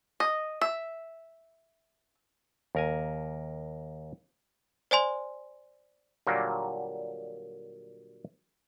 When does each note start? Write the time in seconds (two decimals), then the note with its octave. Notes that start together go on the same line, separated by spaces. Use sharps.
0.20 D#5
0.61 E5
2.75 D#2 A#4 G#5
4.91 C5 D5 G#5 C6
6.27 A#2 D3 F#3 G3 A#3